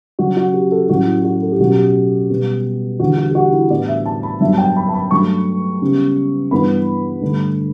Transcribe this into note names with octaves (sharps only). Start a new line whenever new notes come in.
C#3 F#3 C#4 F#4
F#4
G4
A4
A2 F#3 A3 C#4 F#4
E4
F#4
A4
G4
B2 F#3 C#4 F#4
G4
B2 G3 B3
E2 D3 G3 D4 F#4
F#4
G4
F#4
E4
A2 E3 G3 B3 D4 D5
E5
A5
B5
G2 F#3 B3 D4 E5
A5
G5
B5
A5
B5
G2 F#3 A3 D4 C#6
C#3 G3 B3
G2 E3 B3 D4 B5
G2 D3 A3 D4